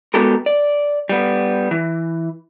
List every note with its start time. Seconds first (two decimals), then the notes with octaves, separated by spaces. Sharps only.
0.14 G#3 B3 F#4 G4 A4 A#4
0.46 D5
1.09 G3 B3
1.71 E3